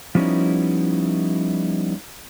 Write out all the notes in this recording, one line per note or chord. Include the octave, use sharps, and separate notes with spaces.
F3 G3 B3 C#4 D#4 E4